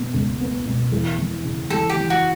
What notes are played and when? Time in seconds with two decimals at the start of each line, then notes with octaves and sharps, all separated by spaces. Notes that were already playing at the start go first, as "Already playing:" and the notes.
Already playing: B2 B3
0.14 C#2
0.40 B3
0.66 B2
0.92 E2
1.18 E3
1.44 C#3
1.70 E3 A4
1.90 G4
1.97 E3
2.10 F#4